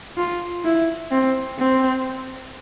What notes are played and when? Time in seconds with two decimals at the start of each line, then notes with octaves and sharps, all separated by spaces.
0.17 F4
0.64 E4
1.11 C4
1.58 C4